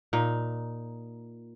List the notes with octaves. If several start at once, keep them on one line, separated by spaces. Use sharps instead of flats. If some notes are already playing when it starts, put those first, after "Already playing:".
A#2 D#4